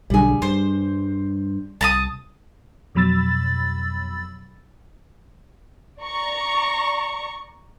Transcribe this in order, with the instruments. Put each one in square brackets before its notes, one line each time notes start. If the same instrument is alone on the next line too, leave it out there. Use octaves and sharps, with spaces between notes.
[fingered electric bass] B1 D3 [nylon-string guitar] G3 G#4
[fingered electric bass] G2 [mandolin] C5
[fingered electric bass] C2 [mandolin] A5 A#5 D#6
[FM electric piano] F2 B2 F#3 B5 E6 A6
[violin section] D5 A#5 C#6